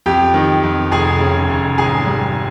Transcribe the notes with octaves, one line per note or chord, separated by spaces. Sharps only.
F2 G4 G5
D#3
F2
F1 G#4 G#5
C#3
F1
G#1 G#4 G#5
G3